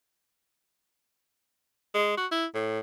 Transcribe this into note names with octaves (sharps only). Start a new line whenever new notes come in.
G#3
F#4
E4
A2